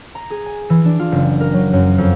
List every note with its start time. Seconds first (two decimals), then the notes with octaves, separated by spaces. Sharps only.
0.15 A#5
0.30 G#4
0.46 G#5
0.70 E3
0.85 D4
0.99 F4
1.12 F#1
1.41 A#4
1.53 F#3
1.73 F#2
1.98 F2